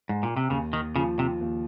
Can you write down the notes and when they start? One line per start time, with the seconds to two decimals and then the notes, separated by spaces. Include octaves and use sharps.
0.09 G#2
0.23 A#2
0.37 C3
0.50 D#2 C#3
0.73 D#3
0.95 C#3 F3
1.19 C3
1.41 D#2